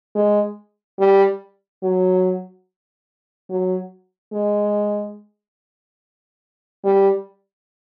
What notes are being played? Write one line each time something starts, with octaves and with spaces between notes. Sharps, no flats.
G#3
G3
F#3
F#3
G#3
G3